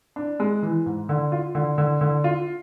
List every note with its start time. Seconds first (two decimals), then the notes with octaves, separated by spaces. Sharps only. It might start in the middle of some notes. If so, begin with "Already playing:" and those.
0.16 D4
0.40 G#3
0.63 E3
0.86 G#2
1.09 D3
1.32 F4
1.55 D3
1.78 D3
2.01 D3
2.24 F4